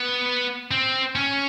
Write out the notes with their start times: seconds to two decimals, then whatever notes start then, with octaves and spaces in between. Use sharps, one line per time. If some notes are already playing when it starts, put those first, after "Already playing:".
Already playing: B3
0.71 C4
1.16 C#4